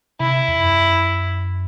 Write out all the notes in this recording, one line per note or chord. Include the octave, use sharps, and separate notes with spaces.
C3 E4
E2
F#2